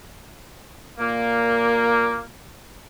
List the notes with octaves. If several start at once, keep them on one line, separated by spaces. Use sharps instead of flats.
A#2 A#3